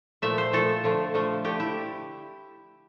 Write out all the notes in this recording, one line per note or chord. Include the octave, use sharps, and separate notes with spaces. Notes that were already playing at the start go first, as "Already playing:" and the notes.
A#2 F3 A3 E5
C5
A#2 F3 A3 A4
D3 F3 A3
D3 F3 A3
D3 A3 G4
E4